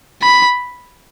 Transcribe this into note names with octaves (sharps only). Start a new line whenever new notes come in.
B5